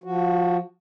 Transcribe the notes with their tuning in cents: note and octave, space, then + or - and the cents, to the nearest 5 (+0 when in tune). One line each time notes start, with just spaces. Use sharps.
F3 +20 F#4 +0